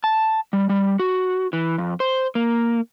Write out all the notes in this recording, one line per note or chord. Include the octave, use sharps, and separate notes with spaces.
A5
G3
G3
F#4
E3
F2
C5
A#3